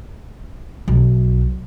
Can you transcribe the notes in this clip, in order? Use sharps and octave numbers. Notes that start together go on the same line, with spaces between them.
B1